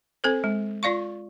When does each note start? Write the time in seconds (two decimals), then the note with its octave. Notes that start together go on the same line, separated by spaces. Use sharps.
0.24 C4 A4 C5
0.44 G#3
0.83 F4 D5 F5 C#6